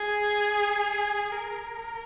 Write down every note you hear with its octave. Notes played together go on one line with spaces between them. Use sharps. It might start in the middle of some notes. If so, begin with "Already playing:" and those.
Already playing: G#4
A#4